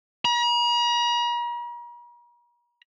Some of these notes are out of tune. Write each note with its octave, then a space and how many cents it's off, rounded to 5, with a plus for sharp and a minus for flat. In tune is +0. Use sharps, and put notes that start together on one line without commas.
A#5 +45